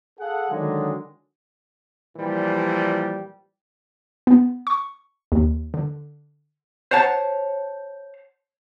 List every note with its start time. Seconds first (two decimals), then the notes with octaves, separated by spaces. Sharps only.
0.20 G#4 A4 F5 F#5
0.51 D3 D#3 F#3 G#3
2.17 A#2 E3 F3 G3
4.27 B3
4.67 C#6
5.32 D#2
5.74 D3
6.91 C5 C#5 F#5 A5